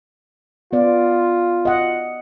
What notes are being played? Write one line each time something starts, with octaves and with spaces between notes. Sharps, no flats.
B3 F4 D5
D#5 F#5